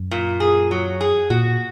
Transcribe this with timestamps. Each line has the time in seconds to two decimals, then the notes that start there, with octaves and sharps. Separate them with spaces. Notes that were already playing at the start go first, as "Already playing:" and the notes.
Already playing: F#2
0.11 A#2
0.40 G#4
0.71 F#3
1.01 G#4
1.30 A#2 F#4